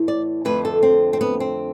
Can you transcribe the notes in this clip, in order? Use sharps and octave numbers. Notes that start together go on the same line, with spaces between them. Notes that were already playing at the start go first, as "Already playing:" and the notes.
Already playing: A2 E3
D5
F2 D3 A3 B4
A4
C4
C4
B3
C4